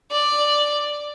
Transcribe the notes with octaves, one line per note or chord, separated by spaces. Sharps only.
D5